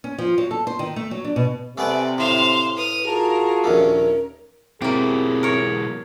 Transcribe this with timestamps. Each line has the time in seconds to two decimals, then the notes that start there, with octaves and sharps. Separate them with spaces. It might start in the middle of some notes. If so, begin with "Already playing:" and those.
0.04 C#4
0.18 F3
0.38 F#3
0.51 A4
0.67 C5
0.79 D#3
0.96 A3
1.11 F#3
1.24 D4
1.36 B2
1.78 C3 A3 B3 B4 D5 G#5
2.18 A2 C5 F5 C6
2.77 B4 D#6 F6
3.06 F4 F#4 G#4 A#4 A5
3.64 A#1 D#2 A3 C#4 A#4
4.82 B2 F#3 A#3 C4 E4 G4 G#4
5.43 A#4 C#5